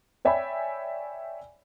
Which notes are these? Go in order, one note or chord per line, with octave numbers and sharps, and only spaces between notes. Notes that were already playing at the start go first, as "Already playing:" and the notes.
C#5 D5 E5 G5 G#5 B5